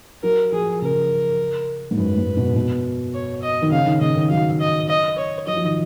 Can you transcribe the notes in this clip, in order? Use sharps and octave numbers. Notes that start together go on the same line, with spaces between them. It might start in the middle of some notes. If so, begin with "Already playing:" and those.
F#3 A#4
F3 G#4
C#3 A#4
G#2
F#2 B4
G#2
B2
B2
C#5
D#5
D#3
C#3 F5
D#3
C#3 D#5
D#3
F#3 F5
D#5
D#5
C#5
F#3 D#5
F3
D#3